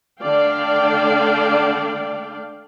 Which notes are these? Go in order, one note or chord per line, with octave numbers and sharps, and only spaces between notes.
D3 A3 D4 D5 F5 G5